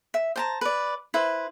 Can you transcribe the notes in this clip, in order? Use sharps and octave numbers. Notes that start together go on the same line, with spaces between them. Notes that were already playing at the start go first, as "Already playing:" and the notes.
E5
C5 A5 A#5
B4 D5
E4 B4 C5